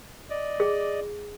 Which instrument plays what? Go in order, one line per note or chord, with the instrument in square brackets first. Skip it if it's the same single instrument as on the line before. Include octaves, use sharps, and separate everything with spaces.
[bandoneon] D5 D#5
[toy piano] G#4